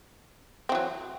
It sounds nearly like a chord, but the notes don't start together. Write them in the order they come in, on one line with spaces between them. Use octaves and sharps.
C4 E3 F#3